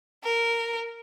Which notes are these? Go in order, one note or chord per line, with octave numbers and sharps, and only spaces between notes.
A#4